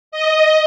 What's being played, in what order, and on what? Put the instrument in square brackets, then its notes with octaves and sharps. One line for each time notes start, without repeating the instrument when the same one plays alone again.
[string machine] D#5